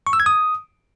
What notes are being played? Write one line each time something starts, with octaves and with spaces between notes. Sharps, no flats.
C#6
E6
G#6
D#6